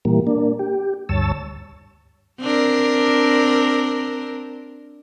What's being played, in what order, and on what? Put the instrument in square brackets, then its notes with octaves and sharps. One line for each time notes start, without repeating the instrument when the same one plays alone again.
[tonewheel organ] A#2 E3 G3 A#3
A#3 D4
G4
D2 G2 C#5 A5 E6
[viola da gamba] C4 D4 A#4